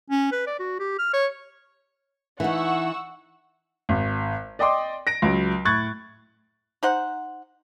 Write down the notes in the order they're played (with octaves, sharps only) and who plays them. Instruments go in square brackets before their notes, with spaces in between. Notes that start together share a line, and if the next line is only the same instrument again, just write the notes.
[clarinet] C#4
B4
D5
F#4
G4
F6
C#5
[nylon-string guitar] E3 D#4 [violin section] F#5 C#6 E6
[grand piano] G#1
D5 D#5 G5 C6 D6
A#6 D7
C#2 F#3
A2 C#6 F#6 G#6 A6
[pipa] D#4 C5 F#5